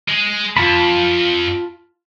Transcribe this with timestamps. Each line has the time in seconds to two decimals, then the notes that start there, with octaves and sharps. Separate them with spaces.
0.08 G#3 G#4
0.57 F2 F4 A5 B5